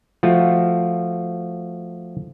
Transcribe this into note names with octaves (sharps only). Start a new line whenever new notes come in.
F3 A3 F4 F#4